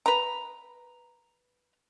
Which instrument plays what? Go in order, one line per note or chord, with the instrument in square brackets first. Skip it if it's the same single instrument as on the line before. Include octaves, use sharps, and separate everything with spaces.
[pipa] B4 A#5